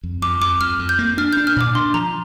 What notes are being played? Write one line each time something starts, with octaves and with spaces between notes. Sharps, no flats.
F2
F2 D6
F2 D6
F2 F6
F2
G6
A#3
D4 F6
D4 G6
F6
A#2 D6
D4 C6
F3 A#5